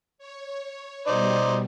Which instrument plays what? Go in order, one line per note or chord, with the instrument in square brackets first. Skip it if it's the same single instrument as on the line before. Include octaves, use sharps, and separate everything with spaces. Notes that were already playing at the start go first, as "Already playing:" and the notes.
[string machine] C#5
[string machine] B2 G3 [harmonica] D#4 C5 D5